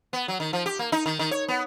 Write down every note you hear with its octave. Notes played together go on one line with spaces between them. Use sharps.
B3
F#3
D#3
F3
G4
A#3
D#4
D#3
D#3
C#5
B3